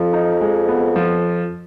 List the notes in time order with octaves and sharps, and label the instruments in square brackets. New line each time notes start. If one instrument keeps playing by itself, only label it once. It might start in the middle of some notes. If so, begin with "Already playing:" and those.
Already playing: [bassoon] F2 [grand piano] F3
[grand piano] D#4
G#3
B3
F3